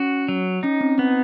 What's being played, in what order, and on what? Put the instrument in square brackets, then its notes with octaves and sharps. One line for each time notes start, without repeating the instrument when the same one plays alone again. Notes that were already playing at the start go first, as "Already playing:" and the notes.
Already playing: [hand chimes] C#4 [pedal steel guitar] F#4
[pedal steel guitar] F#3
[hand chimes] C#4 [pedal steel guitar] D#4
[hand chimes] C4
[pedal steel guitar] B3 [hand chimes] C4